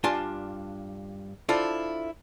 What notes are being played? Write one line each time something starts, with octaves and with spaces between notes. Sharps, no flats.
G2 D4 F4 G#5 A5 C6
D4 E4 F4 A4 C5